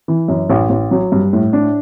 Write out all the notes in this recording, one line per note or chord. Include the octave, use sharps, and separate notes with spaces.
E3
F#2
A1
A1
F#3
G2
A2
D4